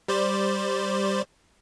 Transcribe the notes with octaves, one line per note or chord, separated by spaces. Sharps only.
G3 C5 D5